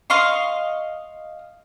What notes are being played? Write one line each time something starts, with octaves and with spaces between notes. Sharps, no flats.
D#5 F5 C6 C#6